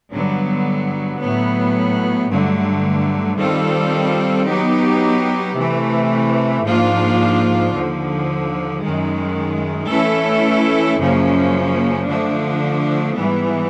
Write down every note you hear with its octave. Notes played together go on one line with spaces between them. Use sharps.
G2 D3 F#3 B3
A2 F#3 B3
G2 D3 F#3 A3
D#3 G3 C4 F4 A4
F#3 B3 D#4 G4
C3 E3 A3
G#2 F3 A#3 D4 F4
D#2 D3 F3
F#2 D#3 G#3
E3 A3 C#4 E4 A4
F#2 C#3 F3 A#3 C#4
D3 F3 A3 D4
G#2 E3 G3 B3